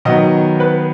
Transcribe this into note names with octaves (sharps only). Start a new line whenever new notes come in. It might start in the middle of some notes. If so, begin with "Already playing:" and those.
D#3 F#3 B3 D#5
B4